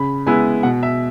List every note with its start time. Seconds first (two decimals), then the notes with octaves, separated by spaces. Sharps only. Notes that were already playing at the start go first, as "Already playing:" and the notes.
Already playing: C#3 B5
0.26 G#3 B3 E4 G#5
0.63 B2 F#5
0.83 E5